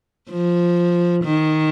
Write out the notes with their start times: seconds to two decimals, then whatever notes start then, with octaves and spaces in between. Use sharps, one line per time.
0.30 F3
1.24 D#3